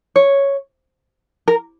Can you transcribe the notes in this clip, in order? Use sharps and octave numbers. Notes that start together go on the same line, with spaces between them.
C#5
A#4